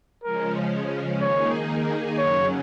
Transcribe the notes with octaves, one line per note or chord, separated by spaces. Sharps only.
C#3 F3 G#3 C#4 A#4
D#3 A#3 D#4 G#4 C#5
F#2 C#3 F#3 C#4 C#5